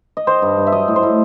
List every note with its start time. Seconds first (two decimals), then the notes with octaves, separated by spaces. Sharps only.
0.17 D#5
0.27 D#3 C5
0.42 G2
0.57 G2
0.67 E5
0.72 F#3 D#5
0.88 A2
0.96 C5
1.03 A2